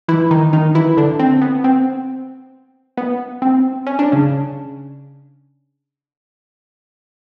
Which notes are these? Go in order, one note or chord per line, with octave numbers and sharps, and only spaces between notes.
E3 E4
D#3 D#4
D#3 D#4
E3 E4
D3 D4
C4
B3
C4
B3
C4
C#4
D4
C#3 C#4